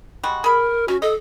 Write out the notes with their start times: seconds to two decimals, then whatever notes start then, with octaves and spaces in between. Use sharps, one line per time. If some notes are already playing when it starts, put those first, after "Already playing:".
0.23 G3 G#3 F#4
0.44 G#4 A#4 B5
0.88 C#4 F#4
1.02 A4 D#5